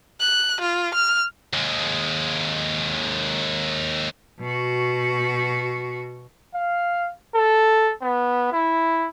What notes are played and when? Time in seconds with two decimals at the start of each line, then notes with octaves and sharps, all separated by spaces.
0.20 F#6
0.61 F4
0.94 F6
1.53 D#2 G#3
4.40 B2 F#4
6.55 F5
7.35 A4
8.02 B3
8.52 E4